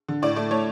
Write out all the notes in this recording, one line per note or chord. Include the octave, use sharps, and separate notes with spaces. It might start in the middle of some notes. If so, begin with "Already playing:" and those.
D3
A2 D5
A3 D5
A3 C#5